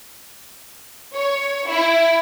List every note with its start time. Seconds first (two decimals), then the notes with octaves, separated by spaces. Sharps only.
1.15 C#5
1.69 E4